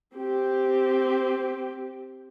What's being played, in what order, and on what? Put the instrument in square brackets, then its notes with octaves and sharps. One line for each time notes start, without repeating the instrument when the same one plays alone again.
[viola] C4 G4